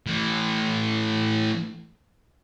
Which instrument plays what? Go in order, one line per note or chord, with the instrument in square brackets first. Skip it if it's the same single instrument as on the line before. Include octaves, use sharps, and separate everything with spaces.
[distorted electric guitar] A2 E3